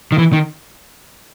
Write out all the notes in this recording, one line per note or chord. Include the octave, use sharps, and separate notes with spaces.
D#3
E3
D#3